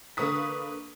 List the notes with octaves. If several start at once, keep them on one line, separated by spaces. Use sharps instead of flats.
D3 A#3 B4 C#6 D#6 B6